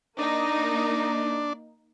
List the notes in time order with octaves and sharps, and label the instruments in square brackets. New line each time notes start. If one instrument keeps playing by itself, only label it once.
[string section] A#3 D#4 [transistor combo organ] D4